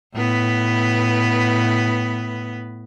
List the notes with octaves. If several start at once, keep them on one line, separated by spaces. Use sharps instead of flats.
A2 B3 B4